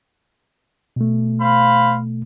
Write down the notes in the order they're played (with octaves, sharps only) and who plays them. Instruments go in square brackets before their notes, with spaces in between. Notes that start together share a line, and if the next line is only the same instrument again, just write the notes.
[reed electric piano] B2 A3
[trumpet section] C5 F5 B5